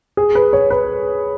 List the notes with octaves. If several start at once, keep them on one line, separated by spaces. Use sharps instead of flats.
G#4
B4
C#5
B4